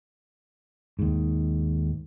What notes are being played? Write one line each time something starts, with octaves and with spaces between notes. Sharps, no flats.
D#2 G#2